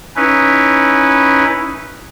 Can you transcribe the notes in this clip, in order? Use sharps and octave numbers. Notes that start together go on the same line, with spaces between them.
C#4 D#4 E4 B4